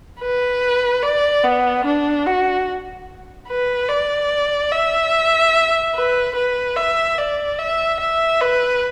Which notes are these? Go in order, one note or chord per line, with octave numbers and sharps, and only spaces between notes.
B4
D5
B3
D4
F#4
B4
D5
E5
B4
B4
E5
D5
E5
E5
B4